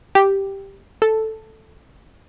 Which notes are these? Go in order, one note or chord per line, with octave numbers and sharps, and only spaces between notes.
G4
A4